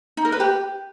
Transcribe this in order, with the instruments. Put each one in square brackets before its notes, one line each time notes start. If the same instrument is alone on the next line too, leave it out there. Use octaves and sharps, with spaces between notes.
[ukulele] D#4
A#4
B4
G4